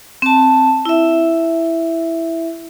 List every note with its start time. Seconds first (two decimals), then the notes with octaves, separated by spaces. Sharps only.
0.22 C4 A5
0.85 E4 E5